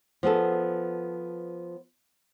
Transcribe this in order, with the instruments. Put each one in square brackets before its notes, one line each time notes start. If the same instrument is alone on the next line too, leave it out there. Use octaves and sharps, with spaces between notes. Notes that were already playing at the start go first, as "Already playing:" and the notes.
[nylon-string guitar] F3 B3 G#4 A4